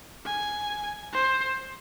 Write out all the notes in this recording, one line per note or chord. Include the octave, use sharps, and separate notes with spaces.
G#5
C5